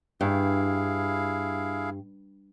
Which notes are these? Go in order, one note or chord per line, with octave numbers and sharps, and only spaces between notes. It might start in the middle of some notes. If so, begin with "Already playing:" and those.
G2 E4 G#4 F5